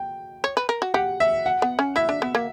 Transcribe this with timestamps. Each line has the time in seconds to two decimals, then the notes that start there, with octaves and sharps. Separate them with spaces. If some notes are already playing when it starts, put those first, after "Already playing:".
Already playing: G5
0.44 C#5
0.57 B4
0.69 A#4
0.82 F#4
0.94 G4 F#5
1.20 E5
1.46 F#5
1.62 B3
1.79 C#4
1.96 E4 E5
2.09 D4
2.22 B3
2.35 A#3